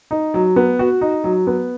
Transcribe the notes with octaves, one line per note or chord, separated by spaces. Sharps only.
D#4
F#3
B3
F#4
D#4
F#3
B3